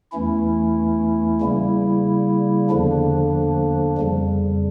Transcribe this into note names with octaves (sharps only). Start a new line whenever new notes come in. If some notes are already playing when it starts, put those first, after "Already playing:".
E2 E3 A3 C#4 E4
C#3 G3 A#3 E4
E2 D3 F3 A#3 D4
F2 C#3 G3